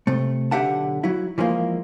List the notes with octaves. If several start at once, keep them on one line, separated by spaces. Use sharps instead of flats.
C3 A3
B1 D3 G4 E5 F#5 A5
F#3 E4
E3 F3 G#3 A#3